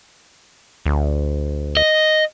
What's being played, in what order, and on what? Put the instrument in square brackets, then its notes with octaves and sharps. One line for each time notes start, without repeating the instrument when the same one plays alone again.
[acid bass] D2
[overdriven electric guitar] D#5